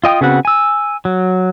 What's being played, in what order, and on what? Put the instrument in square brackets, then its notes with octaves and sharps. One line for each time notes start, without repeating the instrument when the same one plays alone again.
[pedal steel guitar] F4 D#5 G5 D#6
C#3 B3 C4 F#4 F#5
G#5 E6
F#3